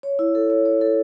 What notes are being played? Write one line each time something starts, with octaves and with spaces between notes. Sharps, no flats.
C#5
E4
A4
C#5
C#5
A4